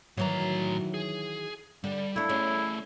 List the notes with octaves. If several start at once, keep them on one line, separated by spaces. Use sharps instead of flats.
A2 D#3 E3 F#3 A#5
G#4
D3 G3
A3 D4 E4
A3 C#4 G#4